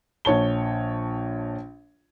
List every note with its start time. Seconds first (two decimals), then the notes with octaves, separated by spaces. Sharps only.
0.25 A#1 C#5 A5 G7